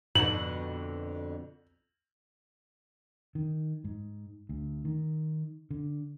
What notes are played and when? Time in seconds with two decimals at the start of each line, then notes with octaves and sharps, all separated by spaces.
0.15 F2 G#2 B2 D3 F#7
3.35 D#3
3.84 G#2
4.49 D2
4.85 D#3
5.71 D3